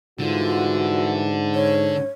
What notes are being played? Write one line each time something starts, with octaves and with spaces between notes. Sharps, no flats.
G#2 D3 E3 G3 F4 F#4
C#5